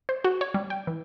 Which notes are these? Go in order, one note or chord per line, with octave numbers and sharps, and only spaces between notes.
C5
F#4
C#5
G3
G5
E3